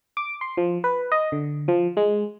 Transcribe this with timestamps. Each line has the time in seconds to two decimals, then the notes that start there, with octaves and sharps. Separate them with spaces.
0.17 D6
0.41 C6
0.57 F3
0.84 B4
1.12 D#5
1.32 D3
1.68 F3
1.97 G#3